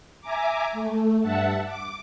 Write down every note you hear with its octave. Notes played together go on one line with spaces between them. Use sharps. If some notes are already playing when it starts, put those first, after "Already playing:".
E5 G#5 A#5 D6
A3
G2 E5 F#5 A5
D6